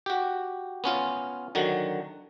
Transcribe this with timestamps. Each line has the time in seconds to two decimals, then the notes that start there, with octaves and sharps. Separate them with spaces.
0.06 F#4 G4
0.84 B3 C#4 F4
1.55 D3 D#3 F#3 F#4